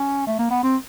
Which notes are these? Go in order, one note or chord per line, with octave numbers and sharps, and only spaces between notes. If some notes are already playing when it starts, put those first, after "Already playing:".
Already playing: C#4
A3
A#3
B3
C4